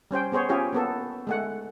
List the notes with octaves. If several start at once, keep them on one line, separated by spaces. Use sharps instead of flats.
G3 C#4 C5 G5
B3 G#4 C5 C#5
C#4 F4 G4 G#4 C#5
A#3 B3 A4
G#3 A3 F#5